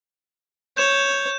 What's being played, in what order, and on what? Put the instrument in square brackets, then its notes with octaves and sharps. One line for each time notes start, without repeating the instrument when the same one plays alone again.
[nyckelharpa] C#5 [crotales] G6 E7